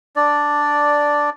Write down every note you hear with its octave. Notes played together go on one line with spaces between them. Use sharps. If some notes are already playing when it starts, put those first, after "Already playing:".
D4 D5